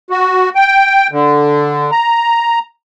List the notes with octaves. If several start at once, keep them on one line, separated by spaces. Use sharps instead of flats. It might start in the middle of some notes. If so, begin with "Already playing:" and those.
F#4
G5
D3
A#5